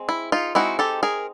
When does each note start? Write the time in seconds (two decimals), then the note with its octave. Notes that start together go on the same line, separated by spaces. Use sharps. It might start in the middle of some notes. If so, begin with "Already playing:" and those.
Already playing: G#3 C4
0.09 E4
0.32 D#4 F4
0.55 G#3 C4 D#4 E4 F#4
0.79 G4 A4
1.03 G#4 A#4